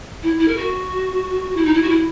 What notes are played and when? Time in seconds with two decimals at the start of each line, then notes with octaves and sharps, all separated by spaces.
0.23 E4
0.39 E4
0.48 A#4
0.57 F#4
1.57 E4
1.65 D#4
1.74 E4
1.82 F#4
1.90 E4